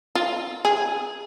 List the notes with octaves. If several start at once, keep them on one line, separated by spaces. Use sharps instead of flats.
F4
G#4